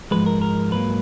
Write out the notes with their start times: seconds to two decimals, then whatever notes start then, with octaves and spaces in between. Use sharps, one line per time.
0.11 G#2 F3 G#3 B4
0.26 A#4
0.41 A#4
0.72 G#2 F#3 A#3 B4